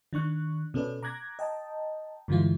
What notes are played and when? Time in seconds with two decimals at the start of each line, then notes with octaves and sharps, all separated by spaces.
0.13 D#3 D4 C#6 F#6
0.74 B2 C#4 A4 B4 D5
1.03 A#5 D6 F#6 G#6 A#6
1.39 D#5 G5 A5 A#5
2.28 G2 D3 E3 G#3 E4 F4